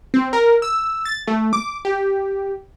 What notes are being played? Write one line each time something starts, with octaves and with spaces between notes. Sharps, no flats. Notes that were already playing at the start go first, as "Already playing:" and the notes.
C4
A#4
E6
A6
A3
D6
G4